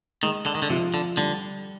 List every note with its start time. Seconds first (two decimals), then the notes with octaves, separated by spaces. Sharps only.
0.23 D#3 G#3
0.46 D3
0.55 D#3
0.62 D3
0.70 C3 F3
0.94 D3
1.17 D3 G3